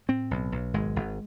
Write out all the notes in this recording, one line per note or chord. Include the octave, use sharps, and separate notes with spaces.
A2 C4
B1
B1
G#1 G#3
G#1